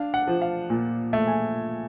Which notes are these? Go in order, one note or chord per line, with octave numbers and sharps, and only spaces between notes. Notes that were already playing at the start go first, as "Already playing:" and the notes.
Already playing: D4 F5
F#5
F3
F5
A#2
A3
G#5